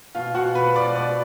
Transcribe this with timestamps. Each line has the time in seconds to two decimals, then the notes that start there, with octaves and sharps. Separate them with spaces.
0.15 B2 F4 F5
0.34 B2 F#4 F#5
0.55 B2 B4 B5
0.75 B2 D5 D6
0.96 B2 D5 D6